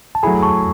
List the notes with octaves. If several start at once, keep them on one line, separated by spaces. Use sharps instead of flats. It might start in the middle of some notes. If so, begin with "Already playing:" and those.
A5
F#3 A3 E4 G#4 G#5 B5
A5 C#6